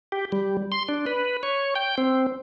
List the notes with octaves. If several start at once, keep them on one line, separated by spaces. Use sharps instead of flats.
G4
G3
C6
D4
B4
C#5
G5
C4